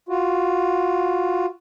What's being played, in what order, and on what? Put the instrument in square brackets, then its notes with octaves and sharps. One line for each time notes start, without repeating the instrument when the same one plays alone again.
[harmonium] F4 F#4